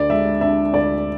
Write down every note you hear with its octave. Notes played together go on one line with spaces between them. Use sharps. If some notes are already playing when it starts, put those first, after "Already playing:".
Already playing: D2 D5
G#3 E5
D4 E5
D2 D5